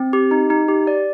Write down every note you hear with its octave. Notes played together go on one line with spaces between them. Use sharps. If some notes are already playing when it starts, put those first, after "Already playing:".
Already playing: C4
G4
D#4
D#4
G4
D5